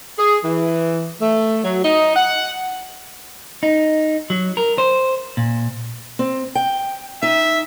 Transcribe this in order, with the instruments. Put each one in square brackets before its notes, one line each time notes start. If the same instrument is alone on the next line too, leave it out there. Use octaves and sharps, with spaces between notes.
[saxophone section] G#4
E3
A3
F#3
D#4
F#5
[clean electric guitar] D#4
F#3
A#4
C5
A#2
[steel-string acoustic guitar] C4
G5
[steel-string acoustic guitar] D#4 [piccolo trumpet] E5